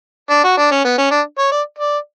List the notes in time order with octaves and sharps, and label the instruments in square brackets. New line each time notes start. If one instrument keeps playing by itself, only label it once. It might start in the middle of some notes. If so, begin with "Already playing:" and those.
[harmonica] D4
F#4
D4
C#4
B3
C#4
D4
C#5
D5
D5